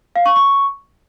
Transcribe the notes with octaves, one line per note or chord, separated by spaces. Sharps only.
F5
C#6
C#6